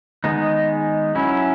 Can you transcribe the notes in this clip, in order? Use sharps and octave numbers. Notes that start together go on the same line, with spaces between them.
D#3 G#3 B3 D#4
F#3 C#4 E4